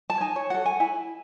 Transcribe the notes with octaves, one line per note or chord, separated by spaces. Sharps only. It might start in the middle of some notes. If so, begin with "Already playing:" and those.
A5
D#4 G#5
C#5
F#4 A4 F#5
G#5
E4 G#5